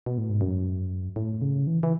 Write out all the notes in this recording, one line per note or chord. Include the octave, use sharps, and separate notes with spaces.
B2
A2
G#2
F#2
A2
C#3
E3
E3